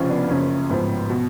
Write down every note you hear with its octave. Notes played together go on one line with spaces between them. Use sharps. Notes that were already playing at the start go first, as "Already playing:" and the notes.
Already playing: F1 F2 C#3 F3 C#4 F4
B3 D4
F#1 F#2 C#3 F3 C#4
A1 G#2 F3 B3
B2